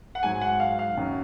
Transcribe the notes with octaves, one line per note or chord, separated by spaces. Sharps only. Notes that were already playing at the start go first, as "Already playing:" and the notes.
F#5
G#2 F#3 G#5
F#5
F5
F5
F#2 D#3 F#3